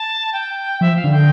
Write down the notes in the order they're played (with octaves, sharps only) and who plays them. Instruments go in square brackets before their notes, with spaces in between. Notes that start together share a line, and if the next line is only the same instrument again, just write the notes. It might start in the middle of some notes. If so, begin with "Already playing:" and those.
Already playing: [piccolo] A5
G5
[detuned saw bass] F3 [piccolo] E5
[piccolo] F5
[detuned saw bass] D3
[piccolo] G5